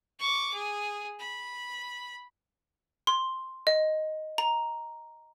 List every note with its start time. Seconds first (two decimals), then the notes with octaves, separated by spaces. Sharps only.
0.19 C#6 D6
0.53 G#4
1.19 B5
3.07 C6
3.67 D#5
4.38 A#5